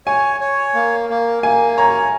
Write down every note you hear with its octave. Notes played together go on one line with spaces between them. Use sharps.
C#5 G#5
C#5
A#3
A#3
A#3 G#5
C#5 A#5